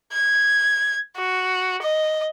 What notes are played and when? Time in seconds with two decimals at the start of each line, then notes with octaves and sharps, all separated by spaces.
0.13 G#6
1.16 F#4
1.82 D#5